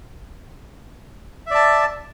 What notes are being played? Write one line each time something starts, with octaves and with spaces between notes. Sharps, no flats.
D5 E5 A5